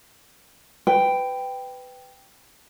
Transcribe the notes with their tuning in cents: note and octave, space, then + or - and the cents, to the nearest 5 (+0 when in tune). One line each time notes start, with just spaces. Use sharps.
B4 +20 G5 +0